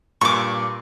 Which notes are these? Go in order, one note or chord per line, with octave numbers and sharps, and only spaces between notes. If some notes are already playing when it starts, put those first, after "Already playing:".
G2 A#2 C#6 D6